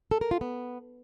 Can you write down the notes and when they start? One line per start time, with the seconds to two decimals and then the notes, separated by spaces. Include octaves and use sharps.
0.11 A4
0.21 A#4
0.31 F4
0.41 B3